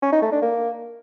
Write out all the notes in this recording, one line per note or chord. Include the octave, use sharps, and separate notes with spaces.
C#4
D#4
A3
D4
A#3